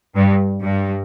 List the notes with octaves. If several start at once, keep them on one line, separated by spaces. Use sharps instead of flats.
G2
G2